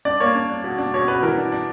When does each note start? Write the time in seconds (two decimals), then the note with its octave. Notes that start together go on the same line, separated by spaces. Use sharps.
0.05 D4 D5
0.20 A#3 C#5
0.35 D4
0.50 D4
0.64 B2
0.78 D4
0.94 B2 C#5
1.08 B2 B4
1.23 E3 A#4
1.37 D4
1.52 D4